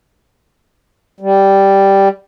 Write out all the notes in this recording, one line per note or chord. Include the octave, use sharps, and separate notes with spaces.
G3